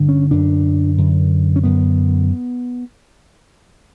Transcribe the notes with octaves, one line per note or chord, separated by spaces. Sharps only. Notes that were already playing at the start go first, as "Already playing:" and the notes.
Already playing: G2 D3
C#4
F#2 D3 D4
F#2 D3
C#4
F#2 D3 B3